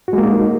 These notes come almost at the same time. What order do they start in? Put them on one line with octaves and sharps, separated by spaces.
F#4 G#3 A#3 D#4